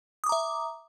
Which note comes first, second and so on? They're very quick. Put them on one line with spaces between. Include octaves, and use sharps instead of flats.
D#6 D6 A#5 E5